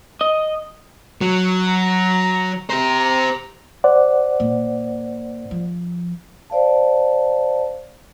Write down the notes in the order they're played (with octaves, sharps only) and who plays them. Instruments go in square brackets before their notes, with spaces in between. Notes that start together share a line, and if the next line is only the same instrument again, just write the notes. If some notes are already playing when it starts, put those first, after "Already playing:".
[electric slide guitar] D#5
[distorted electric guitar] F#3
[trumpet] A#5
[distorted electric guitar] G4 C5 [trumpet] A#5
[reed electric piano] C5 D5 F#5
[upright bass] A#2
F3
[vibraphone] C5 D5 F5 A5